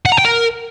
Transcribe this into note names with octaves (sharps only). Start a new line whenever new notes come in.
F#5
A#5
G5
A#4